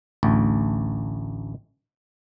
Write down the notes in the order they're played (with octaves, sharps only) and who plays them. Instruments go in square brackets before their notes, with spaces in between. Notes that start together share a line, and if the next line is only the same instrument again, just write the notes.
[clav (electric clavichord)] A1 D2